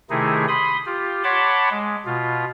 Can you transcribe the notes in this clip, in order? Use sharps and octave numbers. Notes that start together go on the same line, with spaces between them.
C3 D#3 A3 D#4 E4 G#4
B5 C6 D#6
F4 G4
C#5 F#5 A5 B5 C6 D6
G#3
B2 F4